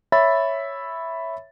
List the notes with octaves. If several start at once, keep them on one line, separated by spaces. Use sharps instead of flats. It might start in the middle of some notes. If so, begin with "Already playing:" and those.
C#5 E5 B5 A6